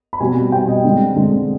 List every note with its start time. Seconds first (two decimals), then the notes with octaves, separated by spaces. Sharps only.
0.13 B5
0.20 B2 G3 C4 G#5
0.52 B2 G3 C4 G5
0.68 D#5
0.84 D3 G#3 C4
1.16 D3 G#3 C4